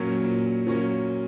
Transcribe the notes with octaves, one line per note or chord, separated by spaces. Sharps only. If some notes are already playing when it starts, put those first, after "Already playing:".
Already playing: A#2 F#3 A#3 C#4
A#2
F#3 A#3 C#4